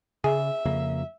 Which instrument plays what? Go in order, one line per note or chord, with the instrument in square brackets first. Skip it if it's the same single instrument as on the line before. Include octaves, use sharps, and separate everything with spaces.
[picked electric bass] C#3 [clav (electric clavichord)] G#4 [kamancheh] E5
[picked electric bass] F2 C#3 A#3